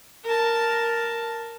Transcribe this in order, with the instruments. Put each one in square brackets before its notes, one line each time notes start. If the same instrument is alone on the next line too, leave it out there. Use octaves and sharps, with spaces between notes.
[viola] A#4 A5